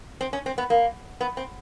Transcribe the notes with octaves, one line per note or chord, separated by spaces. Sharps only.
C4
C#4
C4
B3
A#3
B3
C4